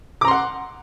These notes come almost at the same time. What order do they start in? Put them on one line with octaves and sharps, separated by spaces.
D6 A#5 C6 F#5